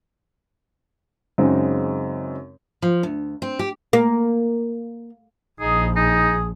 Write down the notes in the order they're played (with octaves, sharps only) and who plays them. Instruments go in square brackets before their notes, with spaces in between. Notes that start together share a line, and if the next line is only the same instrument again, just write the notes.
[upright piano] F#2 C#3 G#3 C4 D#4
[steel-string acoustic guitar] F3
D2
C4
G4
[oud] A#3
[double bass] A#1 F3 [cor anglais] D#4 [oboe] G#4
[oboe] D#4 [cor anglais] G#4